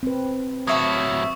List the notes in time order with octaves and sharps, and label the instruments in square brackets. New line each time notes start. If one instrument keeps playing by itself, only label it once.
[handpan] C4 B4
[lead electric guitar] A2 F#3 [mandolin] C#5 E5 F5 [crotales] C#6 D#6